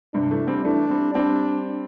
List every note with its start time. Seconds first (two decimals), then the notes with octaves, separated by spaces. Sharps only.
0.14 G2 C3 D4
0.31 E3 A3
0.48 G3 C4
0.65 E3 A3 D4
0.90 G3 C4
1.14 G3 C4 D4